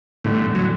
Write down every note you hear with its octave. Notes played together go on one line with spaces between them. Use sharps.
E2 A2 D3 G3
F#3